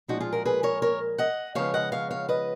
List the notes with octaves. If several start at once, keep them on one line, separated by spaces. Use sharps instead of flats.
A#2 F3 G#3 D#4 F#4
F4 G#4
F#4 A#4
G#4 B4
A#4 C#5
A#4 C#5
D#5 F#5
C#3 F3 G#3 B3 C#5 F5
D#5 F#5
C#5 F5
C#5 F5
B4 D#5